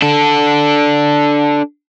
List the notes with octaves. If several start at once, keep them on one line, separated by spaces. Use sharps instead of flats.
D4 A4